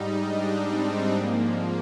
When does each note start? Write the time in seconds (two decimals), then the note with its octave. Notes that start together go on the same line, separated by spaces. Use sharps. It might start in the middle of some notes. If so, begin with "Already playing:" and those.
Already playing: G#2 G3 D#4
0.22 D4
0.68 C4
1.13 G#2 F3 A#3